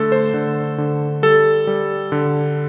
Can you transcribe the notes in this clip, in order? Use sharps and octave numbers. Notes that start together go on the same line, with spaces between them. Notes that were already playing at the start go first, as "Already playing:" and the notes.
Already playing: D3 A3 A4
C5
D3
D3
G3 A4
G3
D3